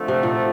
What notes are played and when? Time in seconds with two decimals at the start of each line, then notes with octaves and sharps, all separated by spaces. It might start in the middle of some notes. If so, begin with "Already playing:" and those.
Already playing: F2 D3 F3 A3
0.08 C3
0.23 A#2